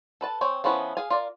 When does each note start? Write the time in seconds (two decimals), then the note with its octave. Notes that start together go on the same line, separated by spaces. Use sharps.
0.21 A4 B4 A5
0.41 C4 C#5 G5 G#5
0.64 F3 B3 C#4 E4 B4
0.97 G#4 F5 G#5
1.10 F4 A#4 D5